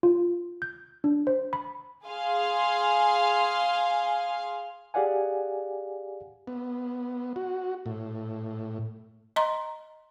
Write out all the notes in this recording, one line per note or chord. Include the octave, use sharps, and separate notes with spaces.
F4
G6
D4
C5
B5
G#4 F5 G#5 C6
G4 G#4 D5 F5 F#5 G#5
B3
F#4
A2
D#5 A#5 C6